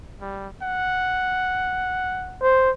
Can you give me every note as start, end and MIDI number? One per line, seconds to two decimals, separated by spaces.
0.21 0.48 55
0.62 2.43 78
2.42 2.71 72